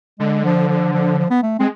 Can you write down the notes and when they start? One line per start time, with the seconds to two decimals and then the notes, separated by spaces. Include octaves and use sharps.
0.20 D3 G#3
0.44 F3
0.69 F3
0.93 F3
1.18 F3
1.30 B3
1.43 A3
1.59 G#3 C4